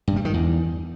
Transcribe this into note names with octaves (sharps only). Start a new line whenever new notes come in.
G2
G3
D#3
E2